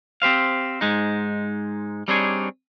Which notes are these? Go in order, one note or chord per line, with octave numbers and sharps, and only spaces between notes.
C4 G4 C5 F5
G#2 G#3 D#4
G3 C4 D4 D#4 G#4 C#5